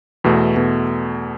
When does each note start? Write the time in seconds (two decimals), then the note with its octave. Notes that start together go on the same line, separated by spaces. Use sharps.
0.24 E2 B2 A3
0.56 B2 A3